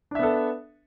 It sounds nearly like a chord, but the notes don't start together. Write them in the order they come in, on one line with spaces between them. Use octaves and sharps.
D4 E5 B3 A4